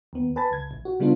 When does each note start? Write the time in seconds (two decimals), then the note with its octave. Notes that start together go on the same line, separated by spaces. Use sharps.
0.13 D#2 B3
0.36 B4 G#5 A5 B5 A6
0.51 C#2 G#6
0.71 A1
0.85 F#4
1.00 C#3 G3 B3 D4 F4